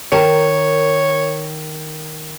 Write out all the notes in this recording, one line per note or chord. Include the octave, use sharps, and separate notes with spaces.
D#3 A#4 C#5 A5